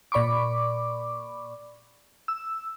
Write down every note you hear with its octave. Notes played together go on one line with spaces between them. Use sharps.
A#2 D5 B5 C#6 D6
E6